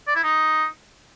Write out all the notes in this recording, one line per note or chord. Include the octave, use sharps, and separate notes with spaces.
D5
E4
D#4